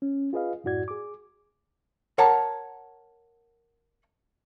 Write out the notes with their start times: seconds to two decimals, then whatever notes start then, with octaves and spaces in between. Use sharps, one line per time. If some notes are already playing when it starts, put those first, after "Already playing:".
0.02 C#4
0.33 F4 G#4 B4 D#5 F5
0.64 F#2 A2 E4 F#4 D5 G#6
0.88 G#4 D6
2.18 A#4 C#5 F#5 A5 A#5